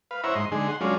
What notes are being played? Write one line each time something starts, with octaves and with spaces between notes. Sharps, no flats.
B4 F5
E4 C5 C#5 E5 F#5 A#5
G#2 D#5 C6
D3 G#3 D#4 G#4
F#5 C6
F#3 G#3 C#4 D4 F4